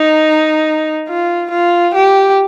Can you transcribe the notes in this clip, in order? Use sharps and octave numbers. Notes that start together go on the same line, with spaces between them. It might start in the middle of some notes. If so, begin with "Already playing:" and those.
Already playing: D#4
F4
F4
G4